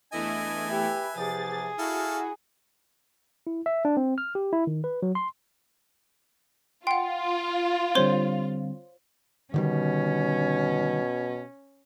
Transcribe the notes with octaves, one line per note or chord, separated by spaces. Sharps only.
E2 E3 A3 D4 E4 D#5 G#5
G4 B4 E5
E2 C3 F3 G#4 A6
E4 F#4 A4 F5
E4
E5
D4
C4
F6
G4
E4
D#3
B4
F#3
C6
F4 F#5 G5 C6
D3 G3 C4 C5 C#5 C6
B2 D3 D#3 G3 C#4